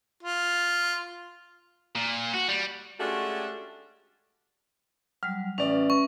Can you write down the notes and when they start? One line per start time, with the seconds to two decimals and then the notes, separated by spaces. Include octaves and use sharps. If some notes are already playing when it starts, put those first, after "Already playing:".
0.23 F4
1.96 A#2
2.34 F#4
2.49 G3
3.00 G#3 A3 C#4 D4 F#4 G4
5.23 F#3 G3 F6
5.58 A1 C#4 B4 D5 E5
5.90 C#6